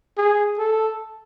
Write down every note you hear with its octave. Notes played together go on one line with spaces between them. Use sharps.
G#4
A4